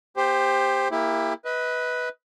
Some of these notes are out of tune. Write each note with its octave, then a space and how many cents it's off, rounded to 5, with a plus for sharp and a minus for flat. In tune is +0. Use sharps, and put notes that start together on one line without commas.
B3 -45 G4 +20 C5 +0
A#3 +0 E4 +0 G4 +30
B4 +0 D#5 +35